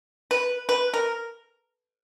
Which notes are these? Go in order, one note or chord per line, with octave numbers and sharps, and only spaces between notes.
B4
B4
A#4